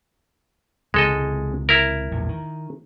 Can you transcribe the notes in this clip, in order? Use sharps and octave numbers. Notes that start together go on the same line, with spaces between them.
C#2 C3 E3 G#3 A4 D#5
E4 A#4
A#1 E2 A2
D#3